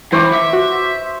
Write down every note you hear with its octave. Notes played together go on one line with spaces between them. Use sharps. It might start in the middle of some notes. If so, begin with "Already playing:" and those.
E3 E4 C5 C#6 D6
E5
F#4